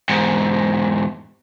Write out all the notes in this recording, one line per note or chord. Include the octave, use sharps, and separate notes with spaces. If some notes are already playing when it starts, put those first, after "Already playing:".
E2 G#2